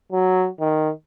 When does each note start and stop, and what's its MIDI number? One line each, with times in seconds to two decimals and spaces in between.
0.12 0.48 54
0.60 0.90 51